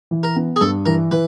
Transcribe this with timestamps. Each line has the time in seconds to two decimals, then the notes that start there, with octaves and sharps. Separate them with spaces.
0.11 E3
0.23 A#4
0.36 B3
0.56 G#4
0.61 G2 A4
0.86 E3 A#4
1.11 E3 B4